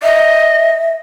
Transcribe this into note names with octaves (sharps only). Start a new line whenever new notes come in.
D#5 E5